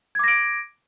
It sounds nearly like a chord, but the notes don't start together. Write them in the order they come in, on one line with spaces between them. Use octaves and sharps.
G#6 D6 A#6 D7